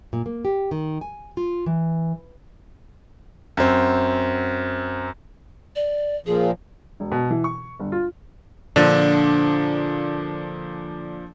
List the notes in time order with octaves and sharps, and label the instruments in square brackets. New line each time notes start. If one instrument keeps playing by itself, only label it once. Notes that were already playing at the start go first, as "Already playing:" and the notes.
[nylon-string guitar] A#2
A#3
G4
D#3
G#5
F4
E3
[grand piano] F#2 C4
[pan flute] D5
[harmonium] A#2 F3 [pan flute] G#4
[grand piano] E1
B2
E3
C#6
G1
F4
[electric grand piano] A#2 F3 D4 [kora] D3